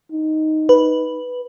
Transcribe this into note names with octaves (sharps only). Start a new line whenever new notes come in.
D#4
B4